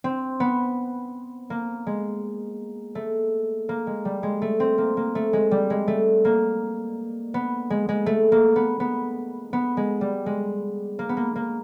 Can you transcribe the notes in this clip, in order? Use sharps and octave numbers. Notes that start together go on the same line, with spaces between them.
C4
B3
A#3
G#3
A3
A#3
G#3
G3
G#3
A3
C4
A#3
A#3
A3
G#3
G3
G#3
A3
A#3
B3
G#3
G#3
A3
A#3
B3
B3
B3
G#3
G3
G#3
A#3
B3
A#3
A#3